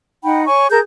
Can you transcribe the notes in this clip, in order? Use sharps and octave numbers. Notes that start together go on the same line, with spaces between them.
D#4 F#5 G5 B5
C#5 G#5 C#6
G#4 A#4 A5 G6